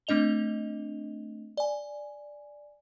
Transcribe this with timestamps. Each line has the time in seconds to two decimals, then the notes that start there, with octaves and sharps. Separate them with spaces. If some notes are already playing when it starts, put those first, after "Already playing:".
0.07 A3 C4 D4 D#5 F7 G7
1.57 D5 G#5